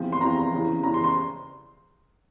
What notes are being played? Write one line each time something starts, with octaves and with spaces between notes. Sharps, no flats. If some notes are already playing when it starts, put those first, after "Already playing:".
Already playing: E2 C3 F3
C6
E2 C3 F3 A#5
A#5
E2 C#3 E3
E2 C#3 E3 A#5
C6
C6